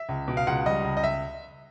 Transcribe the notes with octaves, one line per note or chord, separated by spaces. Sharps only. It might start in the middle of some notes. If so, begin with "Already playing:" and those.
Already playing: E5
C#2
B2
F5
C#2 F#5
G3 D#5
C#2
D#5
E5